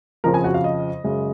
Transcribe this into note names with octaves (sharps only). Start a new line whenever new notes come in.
F2 C#3 F3 A#4 A#5
G#4 G#5
F#4 F#5
F5
D#5
F#2 C#3 G#3